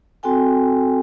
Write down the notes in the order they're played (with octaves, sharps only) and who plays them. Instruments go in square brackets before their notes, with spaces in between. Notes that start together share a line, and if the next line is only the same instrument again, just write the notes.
[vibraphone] C4 F#4 A4 G5 G#5